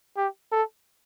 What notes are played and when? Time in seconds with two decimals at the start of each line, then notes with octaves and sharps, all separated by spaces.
0.17 G4
0.52 A4